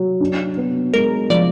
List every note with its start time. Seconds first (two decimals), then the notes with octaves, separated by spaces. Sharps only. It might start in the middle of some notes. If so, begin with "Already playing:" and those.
Already playing: F#3
0.20 D4
0.57 B3
0.94 G#3 A#4
1.30 F3 D5